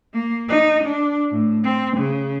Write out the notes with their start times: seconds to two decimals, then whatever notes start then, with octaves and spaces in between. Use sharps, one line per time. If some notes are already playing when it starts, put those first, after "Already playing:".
0.13 A#3
0.48 D#4
0.84 D4
1.32 A2
1.64 C4
1.97 C#3